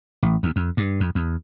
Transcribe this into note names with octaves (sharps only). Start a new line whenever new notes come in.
A1
D#2
F2
G2
F2
E2